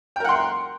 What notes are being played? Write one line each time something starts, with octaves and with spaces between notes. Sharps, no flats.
A#4 F#5 G5 C6